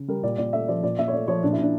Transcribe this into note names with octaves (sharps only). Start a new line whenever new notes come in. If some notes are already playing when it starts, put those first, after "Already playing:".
Already playing: C#3
G3 A#4
A#2 D5
A#2 D5
A3 E5
F3 D5
A#2 D5
A#2 E5
C#5
A3 D5
F3 C#5
A#2 D4
E4
A#2 D4